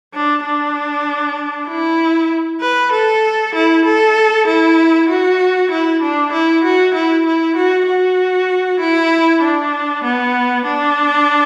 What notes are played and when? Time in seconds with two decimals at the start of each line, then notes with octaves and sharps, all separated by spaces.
0.14 D4
0.44 D4
1.68 E4
2.61 B4
2.92 A4
3.55 E4
3.85 A4
4.47 E4
5.09 F#4
5.71 E4
6.02 D4
6.32 E4
6.64 F#4
6.94 E4
7.26 E4
7.56 F#4
7.87 F#4
8.80 E4
9.42 D4
10.04 B3
10.66 D4